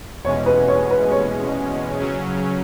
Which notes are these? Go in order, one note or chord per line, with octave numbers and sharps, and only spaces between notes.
E2 B2 G#3 C#4 C#5
B4
C#5
B4
C#5
C#3 F#3 C#4